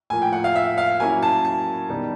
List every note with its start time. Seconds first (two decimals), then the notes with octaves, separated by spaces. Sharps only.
0.10 A2 F3 A#3 G#5
0.22 G5
0.33 F#5
0.44 F5
0.56 E5
0.78 F5
1.00 F#3 A#3 C#4 E4 G#5
1.23 A5
1.45 A5
1.90 D#3 G3 B3 D#4